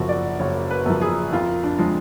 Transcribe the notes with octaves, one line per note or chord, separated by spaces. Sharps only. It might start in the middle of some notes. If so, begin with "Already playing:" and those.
Already playing: F#1 F#2 F3 F#4
D5
F#1 C#5
B4
F#2 F3
G#4
F2 F4
D4
F3 G#3